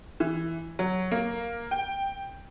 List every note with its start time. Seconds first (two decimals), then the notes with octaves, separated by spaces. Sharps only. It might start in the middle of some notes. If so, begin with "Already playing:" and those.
0.20 E3
0.79 F#3
1.11 A#3
1.71 G5